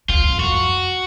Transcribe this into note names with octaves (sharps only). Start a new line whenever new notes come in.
E2 F4
E2
F2
F#2 F#4